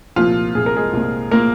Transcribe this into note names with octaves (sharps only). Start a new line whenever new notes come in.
C2 A#2 F3 F4
C2 A#2 G#4
A#4
G#3 G#4
C2 A#2
A#2 A#3 A#4